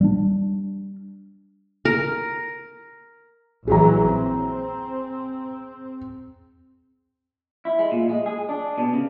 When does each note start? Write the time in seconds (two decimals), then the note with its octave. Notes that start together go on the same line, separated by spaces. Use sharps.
0.01 G3 B3 D4
1.85 A#4
3.67 A#1 E3 F#3 G#4 A#5
4.05 C4
7.65 E4
7.79 G#3
7.91 A#2
8.09 G#3
8.26 G#4
8.49 D4
8.78 B2
8.94 C#3